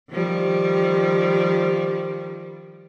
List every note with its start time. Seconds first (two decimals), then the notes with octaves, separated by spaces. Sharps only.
0.10 D#3 F3 G3